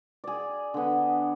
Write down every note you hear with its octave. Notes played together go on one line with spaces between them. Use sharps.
G#4 D5
D3 B3